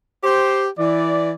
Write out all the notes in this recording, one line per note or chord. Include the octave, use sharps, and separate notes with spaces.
G4 C5
E3 D5